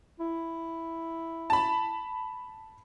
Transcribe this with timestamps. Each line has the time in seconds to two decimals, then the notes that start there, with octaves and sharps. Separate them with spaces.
0.20 E4
1.50 A5 B5